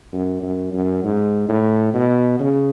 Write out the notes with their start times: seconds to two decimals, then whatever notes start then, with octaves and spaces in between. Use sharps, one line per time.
0.13 F#2
0.43 F#2
0.73 F#2
1.04 G#2
1.49 A2
1.94 B2
2.40 C#3